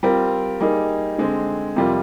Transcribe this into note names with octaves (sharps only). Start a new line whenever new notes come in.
G3 C4 F4 A#4
G3 A#3 D#4 G#4
D3 G#3 C4
F2 C3 G3 A#3 F4